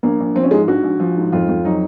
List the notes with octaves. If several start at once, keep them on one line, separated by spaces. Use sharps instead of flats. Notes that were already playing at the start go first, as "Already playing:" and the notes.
A#1 A#3
A#1
F3 C4
C#4
G#2 G#3
A#1 F#4
A#1
F3
G#2
F2 F4
F2
F#3 D#4